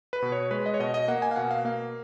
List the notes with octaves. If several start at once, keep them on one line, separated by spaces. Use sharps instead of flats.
B4
B2
C#5
G#3 B4
D#5
C#5
B2 D#5
D#5
A#3 F#5
G#5
F5
B2 F#5
F5
A#3 F5